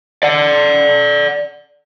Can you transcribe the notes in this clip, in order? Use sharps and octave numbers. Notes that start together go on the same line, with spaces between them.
D5 F#5